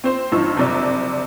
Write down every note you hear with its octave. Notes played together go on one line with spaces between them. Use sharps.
C4 C5 E7
A#1 G2 E3 D#4 E6
F#1 F2 C3 D5 E6